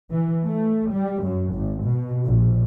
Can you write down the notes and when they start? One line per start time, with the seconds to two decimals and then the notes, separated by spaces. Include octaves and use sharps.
0.11 E3
0.45 A3
0.91 G3
1.23 F#2
1.53 G#1
1.84 B2
2.26 A#1